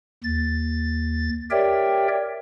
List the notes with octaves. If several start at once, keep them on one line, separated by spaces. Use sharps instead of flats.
D#2 A6
G4 A#4 C#5 D5 E5 G5